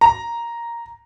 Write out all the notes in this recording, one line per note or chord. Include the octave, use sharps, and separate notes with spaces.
A#5